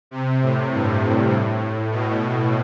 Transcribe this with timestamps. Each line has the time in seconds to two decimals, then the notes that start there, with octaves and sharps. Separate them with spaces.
0.11 C3
0.42 A2
0.71 G2
1.30 A2
1.91 B2